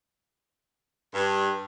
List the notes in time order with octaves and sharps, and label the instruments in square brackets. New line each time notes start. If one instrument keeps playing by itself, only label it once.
[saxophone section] G2